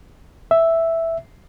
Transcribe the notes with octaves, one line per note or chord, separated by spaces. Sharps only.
E5